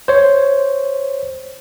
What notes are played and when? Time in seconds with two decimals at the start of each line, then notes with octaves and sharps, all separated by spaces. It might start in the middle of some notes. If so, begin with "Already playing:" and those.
0.08 C5 C#5